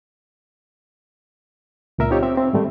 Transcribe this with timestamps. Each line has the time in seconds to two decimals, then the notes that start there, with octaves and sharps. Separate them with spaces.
1.98 C#2 A#2 A#4 E5
2.11 C4 D#4 F4 G4 C#5
2.22 C4 E5
2.38 C4
2.53 G#2 D#3 G3 A3